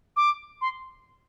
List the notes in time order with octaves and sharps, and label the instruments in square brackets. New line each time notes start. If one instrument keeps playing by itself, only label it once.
[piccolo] D6
C6